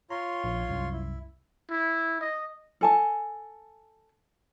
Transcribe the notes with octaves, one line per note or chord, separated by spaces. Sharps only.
F4 C#5 A#5 C6
A#1
C2 F#2
E4
E4
D#5
A4 G#5 A5